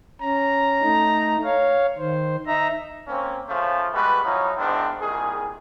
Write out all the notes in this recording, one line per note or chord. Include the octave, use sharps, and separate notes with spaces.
C#4 A#5
A3 D#4
C#5 F5
D#3 C5
D#4 E5 A#5
A#3 C4 C#4
C#3 F3 A3 C#4
G3 G#3 B3 F#4 B4
F3 F#3 C#4 D#4 E4
E2 G#2 D#3 C4 D4
C2 A#2 D#3 G#4